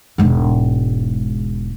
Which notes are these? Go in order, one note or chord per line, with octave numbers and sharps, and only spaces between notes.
E1 G#2